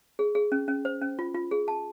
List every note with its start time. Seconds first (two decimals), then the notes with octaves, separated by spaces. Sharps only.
0.19 G#4
0.35 G#4
0.52 C#4
0.68 C#4
0.85 C5
1.02 C#4
1.19 F4
1.35 F4
1.51 G#4
1.68 A5